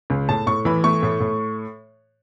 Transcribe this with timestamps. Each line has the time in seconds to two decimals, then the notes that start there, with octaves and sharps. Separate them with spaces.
0.10 C#2
0.29 A2 A5
0.47 A2 C#6
0.65 E3 B5
0.84 A3 C#6
1.02 A2
1.20 A2